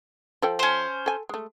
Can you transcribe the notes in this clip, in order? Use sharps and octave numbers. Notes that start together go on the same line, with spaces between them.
F3 A4 G5
C#4 C5
A4 G#5
G#3 A3